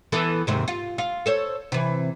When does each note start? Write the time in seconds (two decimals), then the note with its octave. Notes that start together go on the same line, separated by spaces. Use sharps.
0.12 E3 B3 A4
0.47 D#2 G#2 C3
0.68 F4
0.98 F4
1.26 A4 C5 C#5
1.72 C3 E3